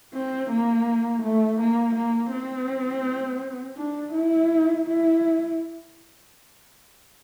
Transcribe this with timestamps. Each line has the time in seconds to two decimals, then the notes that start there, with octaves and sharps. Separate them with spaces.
0.14 C4
0.50 A#3
1.22 A3
1.59 A#3
1.94 A#3
2.31 C4
3.76 D4
4.13 E4
4.85 E4